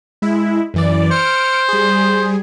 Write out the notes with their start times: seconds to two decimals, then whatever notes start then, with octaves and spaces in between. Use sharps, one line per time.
0.22 G#3 E4
0.74 F#2 E3 D5
1.11 C5 F6 C#7 D7
1.69 G3 G#4